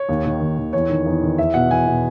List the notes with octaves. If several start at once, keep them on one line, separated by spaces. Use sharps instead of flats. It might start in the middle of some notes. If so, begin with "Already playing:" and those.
Already playing: C#5
D#2
D#3
D#2
D#3
E2 C#5
D#3
E2
D#3
E2 E5
B2 F#5
E2 G#5
B2